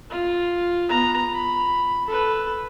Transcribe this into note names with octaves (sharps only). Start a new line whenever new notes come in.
F4
B3 A#5
B5
A4 B4